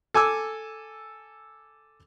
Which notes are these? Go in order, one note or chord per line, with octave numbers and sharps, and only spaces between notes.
A4 G#5 D6 E6